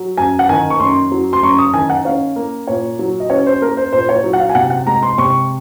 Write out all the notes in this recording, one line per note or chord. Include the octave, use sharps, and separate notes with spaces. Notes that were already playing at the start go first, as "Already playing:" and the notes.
Already playing: F#3
F#2 G#5
F#5
D#3 G#5
C#6
F#2 C6
F#3
C6
F#2 C#6
D#6
D#3 G#5
F#5
C#4 F5
A#3
A#2 C#5
F#3
D#5
C#4 C#5
C5
A#3 A#4
C5
A#2 C5
C#5
F#3
F#5
F5
G#5
C3 F#5
F#5
G#3 A#5
C6
C3 C#6